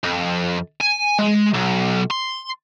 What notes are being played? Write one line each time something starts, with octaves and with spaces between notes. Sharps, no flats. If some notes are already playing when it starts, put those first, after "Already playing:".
F2
G#5
G#3
B1
C6